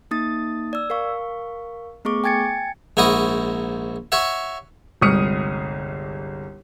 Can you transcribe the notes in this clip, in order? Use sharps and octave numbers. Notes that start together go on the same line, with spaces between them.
A#3 D#4 D#6 A6
D5 E6
A#4 F5 C#6
A3 B3 G#4 C#6 D6
G5 G#5 G#6 A6 C#7
A#1 G#2 E4 F#4 D#5 D#6
F#4 C#5 E5
G1 C2 G#3 D#6 F6 C#7